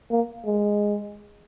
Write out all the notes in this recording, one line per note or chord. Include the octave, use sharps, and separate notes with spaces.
A#3
G#3